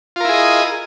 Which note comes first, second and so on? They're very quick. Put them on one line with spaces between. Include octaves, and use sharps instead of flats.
F4 A#4 E4 G#4 D#5